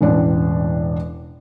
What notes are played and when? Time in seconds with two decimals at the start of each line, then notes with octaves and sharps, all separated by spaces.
0.01 E1 A1 D4 D5